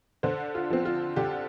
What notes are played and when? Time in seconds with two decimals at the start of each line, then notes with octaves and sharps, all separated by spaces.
0.23 D3 C5
0.55 F4
0.70 F3 C4
0.85 F4
1.16 D3 G4